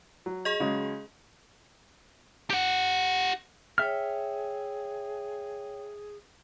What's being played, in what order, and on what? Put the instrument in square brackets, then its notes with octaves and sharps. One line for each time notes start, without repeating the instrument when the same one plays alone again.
[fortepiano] F#3
[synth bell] G#4 D#5
[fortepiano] C#3 F#3 G#3
[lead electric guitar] G4 F#5
[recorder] G#4 [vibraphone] C#5 G5 [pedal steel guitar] E5 F6